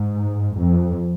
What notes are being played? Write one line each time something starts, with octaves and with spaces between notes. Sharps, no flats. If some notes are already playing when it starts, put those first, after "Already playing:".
Already playing: G#2
F2